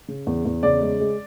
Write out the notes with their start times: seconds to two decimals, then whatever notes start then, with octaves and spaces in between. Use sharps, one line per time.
0.08 C#3
0.27 E2
0.45 E2
0.63 C#3 D5
0.81 G#3
1.00 G#3